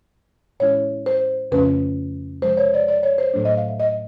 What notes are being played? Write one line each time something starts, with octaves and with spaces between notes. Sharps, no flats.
A2 E3 G#3 C#4 E4 C#5
C5
F2 C#3 F3 A3 C#4 B4
C3 F3 G#3 C5
C#5
D5
D5
C#5
C5
A2 F#3 A3 D4
D#5
F5
E5
D#5